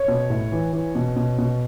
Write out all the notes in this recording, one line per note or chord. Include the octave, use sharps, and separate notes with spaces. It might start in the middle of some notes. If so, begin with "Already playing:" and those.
Already playing: C#5
B2
A2
E3
E3
B2
B2
B2